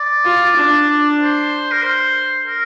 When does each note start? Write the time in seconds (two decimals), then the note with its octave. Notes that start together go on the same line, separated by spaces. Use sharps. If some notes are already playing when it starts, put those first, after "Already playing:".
Already playing: D5
0.25 F4
0.56 D4
1.20 C5
1.71 A#4
1.82 C5
2.46 A#4